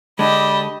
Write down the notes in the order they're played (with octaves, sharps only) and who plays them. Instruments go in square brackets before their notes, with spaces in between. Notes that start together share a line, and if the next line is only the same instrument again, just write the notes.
[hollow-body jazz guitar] D3 G#3 [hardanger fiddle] G4 D#5 [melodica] D5 A5 [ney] B5